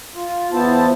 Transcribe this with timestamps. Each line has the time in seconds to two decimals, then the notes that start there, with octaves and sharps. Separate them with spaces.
0.15 F4
0.52 E2 B3 E4 C5 A5